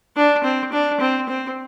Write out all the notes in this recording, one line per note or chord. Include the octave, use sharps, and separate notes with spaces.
D4
C4
D4
C4
C4